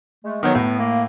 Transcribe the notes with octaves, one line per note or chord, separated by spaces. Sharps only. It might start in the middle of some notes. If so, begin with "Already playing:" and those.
G#3 A3
D#3 F#3 B3
A2
A#3